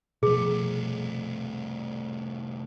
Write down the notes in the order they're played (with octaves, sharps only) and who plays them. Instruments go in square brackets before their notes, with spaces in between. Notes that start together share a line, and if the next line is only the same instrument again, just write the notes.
[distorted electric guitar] C2 A3 [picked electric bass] B2 F3 [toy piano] G#4